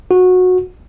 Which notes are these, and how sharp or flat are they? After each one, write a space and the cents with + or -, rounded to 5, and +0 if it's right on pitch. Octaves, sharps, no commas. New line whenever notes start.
F#4 -15